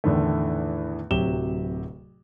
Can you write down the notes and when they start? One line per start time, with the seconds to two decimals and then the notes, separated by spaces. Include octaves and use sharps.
0.04 E2 A2 D3 D#3 A3
1.11 D1 C3 F#3 G4 E7 G7